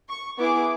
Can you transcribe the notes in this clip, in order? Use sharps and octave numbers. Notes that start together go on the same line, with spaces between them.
C#6
B3 E4 G#4 D6